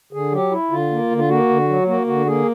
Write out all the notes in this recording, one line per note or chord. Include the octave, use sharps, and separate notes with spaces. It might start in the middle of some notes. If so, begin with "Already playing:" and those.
D3 G#4
F#3 G4
E4
D3 F4
A#3
D3
F4
A#3 F#4
D3
F#3
A#3 F#4
D3 F#4
A#3 G#4